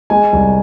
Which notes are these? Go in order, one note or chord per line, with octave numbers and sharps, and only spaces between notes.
G#3 G#5
C2